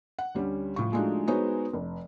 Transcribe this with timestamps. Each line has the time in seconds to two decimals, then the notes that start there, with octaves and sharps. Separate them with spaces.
0.19 F#5
0.35 D2 G3 C#4
0.76 A2 F3 C#6
0.92 F3 G#3 A3 D4 D#4 F#4
1.28 G#3 B3 D#4 F#4 C5 C#5
1.73 F1